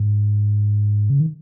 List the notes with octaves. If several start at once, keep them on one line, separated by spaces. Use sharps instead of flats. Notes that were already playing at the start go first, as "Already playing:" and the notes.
Already playing: G#2
C#3
D#3